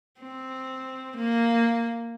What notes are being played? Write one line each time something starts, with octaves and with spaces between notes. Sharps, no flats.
C4
A#3